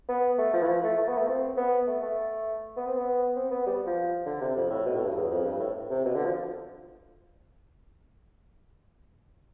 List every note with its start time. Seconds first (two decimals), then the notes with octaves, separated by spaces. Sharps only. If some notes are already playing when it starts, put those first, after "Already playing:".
0.09 B3
0.38 A3
0.53 F3
0.63 E3
0.68 F3
0.83 A3
0.98 A3
1.08 B3
1.18 A3
1.28 C4
1.57 B3
1.87 A3
2.03 A3
2.77 B3
2.87 C4
2.97 B3
3.37 C4
3.51 B3
3.67 G3
3.86 F3
4.26 D3
4.41 C3
4.56 F2
4.70 A2
4.86 B2
4.95 A2
5.05 G2
5.16 E2
5.30 F2
5.45 G2
5.60 A2
5.90 C3
6.05 B2
6.15 D3
6.25 F3